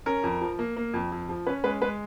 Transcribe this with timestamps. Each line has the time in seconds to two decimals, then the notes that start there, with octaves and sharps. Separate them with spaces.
0.06 C#4 A#4
0.24 F2
0.41 F3
0.59 A#3
0.77 A#3
0.94 F2
1.12 F2
1.29 F3
1.47 C#4 B4
1.64 G#3 B4
1.82 G#3 B4